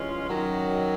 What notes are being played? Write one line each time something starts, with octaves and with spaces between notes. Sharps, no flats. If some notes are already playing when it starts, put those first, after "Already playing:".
Already playing: G2 E3 G#3 C#4 F4
F#2 D#3 F#3